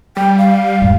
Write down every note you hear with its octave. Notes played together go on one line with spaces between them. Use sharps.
G3 G5
F5
E2 G#2